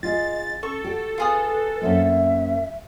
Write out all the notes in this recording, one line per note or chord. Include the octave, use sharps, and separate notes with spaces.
F4 G#4 D#5 A6
C#4 A4 C#6
F#4 G4
F4 G#4 B4 D#6
F#2 A#3 C4 E5